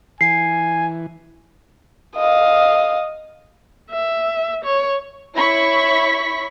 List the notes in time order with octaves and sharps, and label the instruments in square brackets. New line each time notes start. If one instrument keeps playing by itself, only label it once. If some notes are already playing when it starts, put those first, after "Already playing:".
[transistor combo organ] E3 [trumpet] G#5 [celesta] C7
[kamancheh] D#5 F5
[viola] E5
C#5
[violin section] E4 C#5 B5 C#6 B6